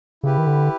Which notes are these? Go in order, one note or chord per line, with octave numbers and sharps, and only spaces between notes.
C#3 E4 G4 B4
D#3
D3